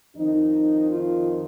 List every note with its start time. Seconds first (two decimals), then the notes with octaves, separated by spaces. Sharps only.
0.16 F2 D#3 D#4
0.89 F4